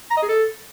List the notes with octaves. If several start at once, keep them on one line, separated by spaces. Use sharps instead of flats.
A#5
D#5
G#4
A4